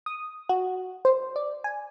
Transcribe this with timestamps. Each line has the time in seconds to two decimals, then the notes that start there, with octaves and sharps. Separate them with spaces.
0.06 D#6
0.49 F#4
1.05 C5
1.36 D5
1.64 G#5